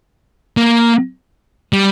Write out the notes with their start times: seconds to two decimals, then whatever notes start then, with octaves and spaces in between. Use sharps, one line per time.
0.57 A#3
1.73 G3